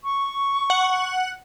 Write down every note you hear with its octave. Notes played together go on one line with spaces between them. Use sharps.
C#6
F#5